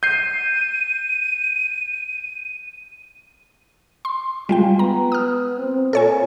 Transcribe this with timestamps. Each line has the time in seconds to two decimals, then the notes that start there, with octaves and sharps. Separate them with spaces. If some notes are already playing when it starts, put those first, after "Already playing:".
0.03 G6 C7 D#7
4.05 C6
4.49 G3 G#3 F4 G5
4.79 B3 A#5
5.12 D#6 F6
5.59 C4
5.93 A#2 A4 C#5 G#5